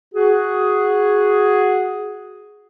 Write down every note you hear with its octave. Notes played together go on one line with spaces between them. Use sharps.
F#4 G#4